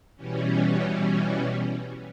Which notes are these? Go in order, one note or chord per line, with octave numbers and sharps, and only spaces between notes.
B2 E3 G3 C#4